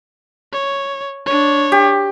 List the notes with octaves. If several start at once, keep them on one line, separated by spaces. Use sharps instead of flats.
C#5
D4 C#5
G4